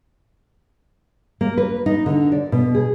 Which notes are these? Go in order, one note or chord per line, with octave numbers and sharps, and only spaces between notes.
A#3
B4
D#4
D3
D5
B2
G#4